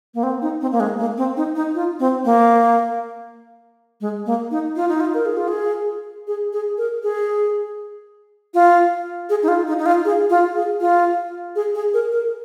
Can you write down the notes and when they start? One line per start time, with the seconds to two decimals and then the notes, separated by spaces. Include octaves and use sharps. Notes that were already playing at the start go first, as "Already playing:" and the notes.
0.14 A#3
0.23 C4
0.42 D#4
0.61 C4
0.72 A#3
0.80 G#3
0.99 A#3
1.17 C4
1.37 D#4
1.56 D#4
1.75 F4
2.00 C4
2.25 A#3
4.01 G#3
4.26 A#3
4.51 D#4
4.76 F4
4.88 D#4
5.00 F4
5.14 A#4
5.26 G#4
5.37 F4
5.48 G#4
6.27 G#4
6.53 G#4
6.78 A#4
7.03 G#4
8.54 F4
9.30 G#4
9.43 D#4
9.48 F4
9.67 D#4
9.79 D#4
9.86 F4
10.05 G#4
10.30 F4
10.55 G#4
10.81 F4
11.56 G#4
11.75 G#4
11.94 A#4
12.12 A#4